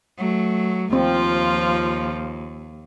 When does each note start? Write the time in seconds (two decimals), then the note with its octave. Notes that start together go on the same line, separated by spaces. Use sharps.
0.18 F#3 A3
0.93 D#2 F3 C4 F4